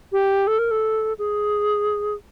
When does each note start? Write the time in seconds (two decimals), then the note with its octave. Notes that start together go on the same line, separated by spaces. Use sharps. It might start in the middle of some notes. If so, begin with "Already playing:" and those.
0.12 G4
0.47 A4
0.59 A#4
0.71 A4
1.18 G#4